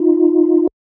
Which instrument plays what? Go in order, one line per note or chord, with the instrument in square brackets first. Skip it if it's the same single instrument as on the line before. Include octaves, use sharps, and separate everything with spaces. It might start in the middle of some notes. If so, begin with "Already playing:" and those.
Already playing: [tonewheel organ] D#4 F4